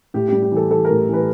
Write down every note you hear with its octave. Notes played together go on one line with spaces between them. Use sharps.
A2 G4
G3 G4
G4
E3 A4
E3 A4
A#4
A2
E3 B4